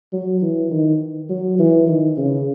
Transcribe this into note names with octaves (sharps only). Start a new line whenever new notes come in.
F#3
E3
D#3
F#3
E3
D#3
C#3